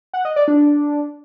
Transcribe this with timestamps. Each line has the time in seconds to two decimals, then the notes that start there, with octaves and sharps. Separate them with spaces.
0.13 F#5
0.25 D#5
0.36 D5
0.48 D4